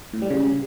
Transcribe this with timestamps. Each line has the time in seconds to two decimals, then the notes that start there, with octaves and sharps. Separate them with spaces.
0.13 A2
0.22 G3
0.30 C#3